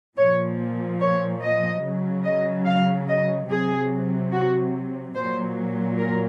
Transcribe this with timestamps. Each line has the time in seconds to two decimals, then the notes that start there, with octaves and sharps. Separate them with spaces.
0.17 A#2 F3 C#5
1.00 C#5
1.42 D#5
1.83 C#3 F#3
2.25 D#5
2.66 F5
3.08 D#5
3.49 C3 F#3 G#4
4.32 F#4
5.14 A#2 F#3 C5
5.98 A#4